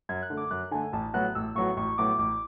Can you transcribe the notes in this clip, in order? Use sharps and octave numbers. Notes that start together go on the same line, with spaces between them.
F#2 G#6
F#6
D3 A3
D6
F#2 F#6
D3 A3 G#5
A1 A5
A2 F#3 B3 F#4 F#6
A1 E6
A2 F#3 B3 F#4 C#6
A1 C#6
A2 F#3 B3 F#4 D6
A1 D6